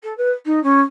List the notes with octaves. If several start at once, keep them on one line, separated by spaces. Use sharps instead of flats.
A4
B4
D#4
C#4